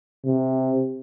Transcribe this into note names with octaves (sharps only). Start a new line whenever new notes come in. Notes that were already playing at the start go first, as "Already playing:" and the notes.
C3